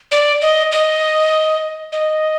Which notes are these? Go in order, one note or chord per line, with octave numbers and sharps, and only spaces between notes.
D5
D#5
D#5
D#5